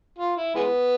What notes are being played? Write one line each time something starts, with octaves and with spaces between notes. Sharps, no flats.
F4
E4
E3 G#3 B3